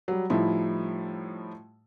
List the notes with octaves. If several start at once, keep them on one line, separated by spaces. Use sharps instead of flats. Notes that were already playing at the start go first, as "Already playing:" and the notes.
F#3 G3
A2 F3 G3 D#4 E4